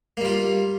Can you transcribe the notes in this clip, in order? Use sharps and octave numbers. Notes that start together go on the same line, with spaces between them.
G3 A#3 F4